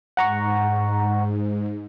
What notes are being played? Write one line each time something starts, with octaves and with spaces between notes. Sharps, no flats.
G#2 F#5 A#5 C#6